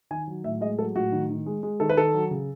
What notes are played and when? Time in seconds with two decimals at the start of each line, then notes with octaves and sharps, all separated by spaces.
0.11 D#3 G#5
0.27 F#3
0.44 A2 E5
0.61 G#3 D#5
0.78 F#3 A4
0.95 A2 F#4
1.12 D#3
1.29 D#3
1.46 G#3
1.63 G#3
1.80 D#3 A4
1.89 B4
1.97 D#3 A4
2.14 F#3
2.31 C#3